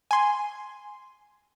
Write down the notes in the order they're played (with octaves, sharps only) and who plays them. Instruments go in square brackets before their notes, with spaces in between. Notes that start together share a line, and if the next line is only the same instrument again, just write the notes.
[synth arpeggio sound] G#5 C6